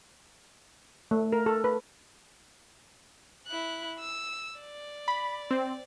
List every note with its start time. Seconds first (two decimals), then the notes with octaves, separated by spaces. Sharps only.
1.11 A3
1.33 A#4
1.46 A4
1.64 B4
3.47 E4 F#6
3.99 E6
4.60 D5
5.08 B5
5.51 C4